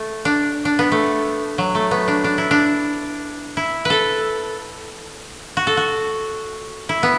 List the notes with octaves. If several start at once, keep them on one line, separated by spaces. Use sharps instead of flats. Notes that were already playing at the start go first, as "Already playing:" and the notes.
Already playing: A3
D4
D4
B3
A3
F#3
A3
B3
D4
D4
E4
D4
E4
A4 B4
F#4
A4
F#4
E4
B3